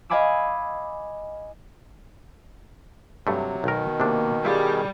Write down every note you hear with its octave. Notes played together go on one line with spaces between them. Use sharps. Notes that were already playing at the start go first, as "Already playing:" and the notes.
D#5 F5 G#5 B5 D6 E6
G2 C3 F#3 A3
B1 B2 D#3 A#4
C3 A#3 D4
G3 E4 F4 G#4